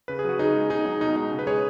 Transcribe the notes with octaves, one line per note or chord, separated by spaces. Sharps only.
C#3 B4
G#4
F#3 F#4
C#3 D#4 G#4
G#3
B2 D#4 G#4
F#3 D#4
B2 D#4
G#3 D#4
C#3
B4
G#3 G#4 C#5